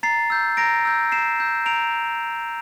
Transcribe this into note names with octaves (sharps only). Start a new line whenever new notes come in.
A#5 A6 C7
E6 G6
A#5 A#6 D7
E6 G6
A#5 C7 E7
E6 G6
A#5 D7 F7